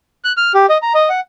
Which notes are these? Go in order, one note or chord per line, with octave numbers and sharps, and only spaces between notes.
F#6
F6
G4
D#5
A#5
D#5
F#5